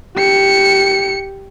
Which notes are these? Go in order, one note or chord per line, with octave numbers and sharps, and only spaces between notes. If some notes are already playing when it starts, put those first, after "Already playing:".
G4 C#7